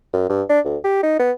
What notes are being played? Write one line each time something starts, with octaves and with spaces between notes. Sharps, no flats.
F#2
G2
D4
D2
G4
D#4
B3